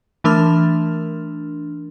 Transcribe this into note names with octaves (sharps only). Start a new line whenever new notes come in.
E3 A3 D4 A#4 C6 F6